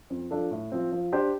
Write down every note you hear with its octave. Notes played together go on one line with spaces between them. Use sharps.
F2
F3 D4 A4
A2
F3 C4
F3
D4 G4 C5